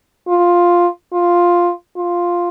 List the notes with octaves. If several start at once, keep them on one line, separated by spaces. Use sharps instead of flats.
F4
F4
F4